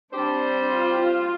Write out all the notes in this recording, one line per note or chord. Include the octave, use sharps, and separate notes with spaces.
G3 C4 D4 G4 C5
F4
F4